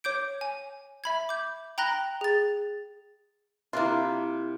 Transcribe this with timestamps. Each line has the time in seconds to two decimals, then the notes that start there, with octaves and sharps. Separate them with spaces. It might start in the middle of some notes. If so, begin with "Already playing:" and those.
0.04 C#5 D6 G6 D7
0.41 G#5
1.04 E5 B5 G#6
1.29 D6 G6
1.78 G5 A#5 B5 F#6 A#6 G7
2.21 G#4 A6
3.73 C3 A#3 D4 E4 F4